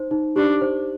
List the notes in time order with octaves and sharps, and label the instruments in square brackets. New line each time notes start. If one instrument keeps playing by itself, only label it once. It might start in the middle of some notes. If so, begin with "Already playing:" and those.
Already playing: [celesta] D#4 C5
D#4
[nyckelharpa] D4 [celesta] G4
[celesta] C5